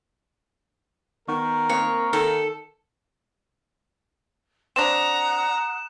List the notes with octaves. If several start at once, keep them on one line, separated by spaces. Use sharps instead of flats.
D#3 B3 A#4 C#6
A#3 C4 C#5 F5
D#3 A4
C4 D4 F#5 A#5 D#6 F#6 E7